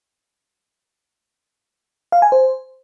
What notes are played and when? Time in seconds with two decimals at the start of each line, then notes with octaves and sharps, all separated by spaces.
2.12 F5
2.22 G#5
2.32 C5